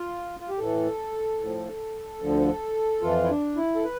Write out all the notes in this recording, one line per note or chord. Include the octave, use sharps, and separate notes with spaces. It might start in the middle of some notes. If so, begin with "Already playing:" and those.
Already playing: F4
F4
G4
A2 E3 A4
A2 F3
D2 D3 F3
F2 E3 F4
E4
D4
E4
A4
B4